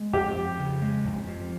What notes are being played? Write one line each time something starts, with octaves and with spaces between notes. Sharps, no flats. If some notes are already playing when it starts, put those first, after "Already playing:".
Already playing: G#3
F2 G4
F3
C#3
G#3
F2
F3